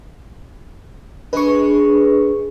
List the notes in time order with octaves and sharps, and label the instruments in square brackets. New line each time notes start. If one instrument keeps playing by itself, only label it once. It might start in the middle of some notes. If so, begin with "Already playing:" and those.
[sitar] G#3 [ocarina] D4 [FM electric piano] B4 C#6